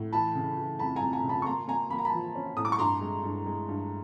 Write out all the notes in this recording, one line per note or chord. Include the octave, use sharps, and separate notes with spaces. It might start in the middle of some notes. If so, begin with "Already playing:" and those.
Already playing: A2
E3 A5 B5
C#3
E3
F2 A5 B5
G#5 A#5
F2
G#5 A#5
C#3
A5 B5
C#6
A#3 A#5 C6
A#3 G#5 A#5
A#3 B5
A#5
A5 B5
F3
C#4
A2 D#6
D6
C#6
G2 A#5 C6
G#3
G2
G#3
G2